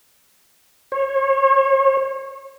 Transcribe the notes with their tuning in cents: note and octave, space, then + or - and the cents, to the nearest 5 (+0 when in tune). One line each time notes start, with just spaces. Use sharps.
C#5 -35